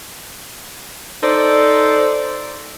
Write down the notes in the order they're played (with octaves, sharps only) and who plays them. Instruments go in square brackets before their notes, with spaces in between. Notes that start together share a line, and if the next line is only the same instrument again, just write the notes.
[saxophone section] D#4 A4 C5 D5